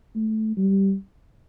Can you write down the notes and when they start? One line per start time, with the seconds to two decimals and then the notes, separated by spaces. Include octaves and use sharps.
0.16 A3
0.57 G3